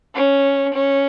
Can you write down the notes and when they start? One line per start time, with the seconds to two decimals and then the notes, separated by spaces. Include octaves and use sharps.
0.14 C#4
0.73 C#4